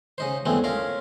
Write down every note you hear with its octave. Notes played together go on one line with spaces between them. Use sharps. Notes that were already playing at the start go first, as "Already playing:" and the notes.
C#3 D#4 C5
E2 G2 G#3 A3 C4
C#4 F4 A#4